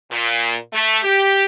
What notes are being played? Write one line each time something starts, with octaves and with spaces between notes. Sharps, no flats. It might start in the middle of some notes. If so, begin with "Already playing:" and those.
A#2
A3
G4